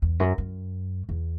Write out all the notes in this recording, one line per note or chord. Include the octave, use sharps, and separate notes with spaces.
E2
F#2
F#2
E2